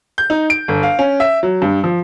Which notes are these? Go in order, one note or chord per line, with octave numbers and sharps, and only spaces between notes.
G6
D#4
D7
G1
F5
C#4
E5
F#3
G2
F3